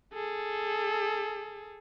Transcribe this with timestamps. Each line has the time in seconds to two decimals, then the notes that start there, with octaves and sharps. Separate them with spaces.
0.14 G#4 A4